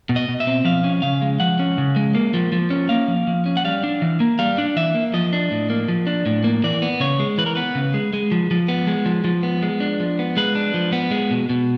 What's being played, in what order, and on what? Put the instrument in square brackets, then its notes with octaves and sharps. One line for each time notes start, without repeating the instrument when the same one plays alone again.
[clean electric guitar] B2
D#5
B2
E5
C4
F3 F5
C#4
C#3 F5
G#3
F3 F#5
C#4
C#3
G#3
A#3
F3
F3
C#4
A#3 F5
F3
F3
C#4
F#5
G3 F5
D4
E3
A#3
G3 F5
D4
E3 E5
A#3
F3 D#5
D4
A2
A#3
F3
D4
A2
A#3
E3 D5
B3
C#3 C#5
G#3
E3 B4
A#4
B3 B4
C#3
G#3
G#3
F3
F3
B3
G#3
F3
F3
B3
G#3
D4
F3
B3
G#3 B4
D4
F3
B3
G#3
B2
B2